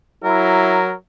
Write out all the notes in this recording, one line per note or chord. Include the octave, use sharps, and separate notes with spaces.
F#3 E4 A#4